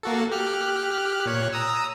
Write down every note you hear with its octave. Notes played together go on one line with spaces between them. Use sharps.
A#3 F#4 A4
G4 F6 F#6
A#2 C#5 F#6
A#5 D#6 E6